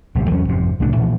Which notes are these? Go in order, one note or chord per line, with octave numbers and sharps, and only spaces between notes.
D1 B1 C3
E2 F#3 A3 C#4
G1 F2 G#2 C3
C2 A2 C#3 D4
A#2 E3 F3